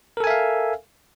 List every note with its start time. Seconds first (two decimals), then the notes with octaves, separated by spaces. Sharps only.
0.17 A#4
0.20 A4
0.24 G#5
0.27 E5
0.30 F5